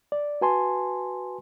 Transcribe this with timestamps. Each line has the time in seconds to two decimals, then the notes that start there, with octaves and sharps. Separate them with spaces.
0.12 D5
0.41 F#4 B4 G#5 A5 C6